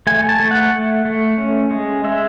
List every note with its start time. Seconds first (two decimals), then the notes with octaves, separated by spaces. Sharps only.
0.07 A3 G#5
0.29 A5
0.40 A3
0.51 F#5
0.73 A3
1.05 A3
1.38 C#4
1.71 G#3
2.04 G#3 E5